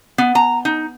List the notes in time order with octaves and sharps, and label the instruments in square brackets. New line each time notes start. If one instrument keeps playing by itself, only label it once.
[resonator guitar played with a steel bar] B3
A#5
D#4